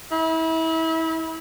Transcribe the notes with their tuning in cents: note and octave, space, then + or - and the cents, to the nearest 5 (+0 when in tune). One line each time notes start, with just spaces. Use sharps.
E4 -30